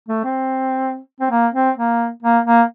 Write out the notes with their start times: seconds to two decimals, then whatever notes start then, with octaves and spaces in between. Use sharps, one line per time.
0.09 A3
0.24 C4
1.20 C4
1.31 A#3
1.54 C4
1.77 A#3
2.23 A#3
2.46 A#3